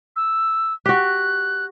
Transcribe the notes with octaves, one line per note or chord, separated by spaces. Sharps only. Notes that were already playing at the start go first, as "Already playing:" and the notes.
E6
F#4 G4 F#6